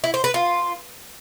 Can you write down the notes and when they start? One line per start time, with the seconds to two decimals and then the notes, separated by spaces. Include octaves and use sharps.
0.04 E4
0.14 C5
0.24 B4
0.34 F4